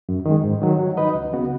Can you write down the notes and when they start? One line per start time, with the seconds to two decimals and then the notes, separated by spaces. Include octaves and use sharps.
0.09 F#2
0.26 D#3
0.31 G#3
0.44 G#2
0.62 D#3 F#3
0.79 F#3
0.97 D#4 B4 D#5
1.15 C#2
1.33 C#3 B3 F#4